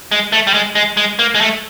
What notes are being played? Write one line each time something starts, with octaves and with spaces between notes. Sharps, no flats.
G#3
A3
G3
G#3
G#3
G#3
A#3
G#3
A3